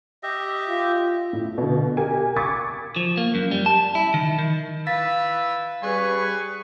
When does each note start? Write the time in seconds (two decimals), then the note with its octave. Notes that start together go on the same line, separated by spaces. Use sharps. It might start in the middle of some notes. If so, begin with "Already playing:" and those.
0.23 G4 D#5 E5
0.68 F4
1.33 A2
1.58 B2 D3
1.97 G4 A#4 G#5
2.36 C#6 D6 G#6 A6 B6
2.96 F3
3.17 A#3
3.35 F#2
3.51 G3
3.66 A5
3.95 E4
4.14 D#3
4.38 D#3
4.87 B4 F5 E6 A6 B6
5.83 G3 G#4 B4 G#5 C#6